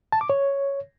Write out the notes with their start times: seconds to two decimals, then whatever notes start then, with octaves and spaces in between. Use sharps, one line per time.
0.12 A5
0.21 D6
0.30 C#5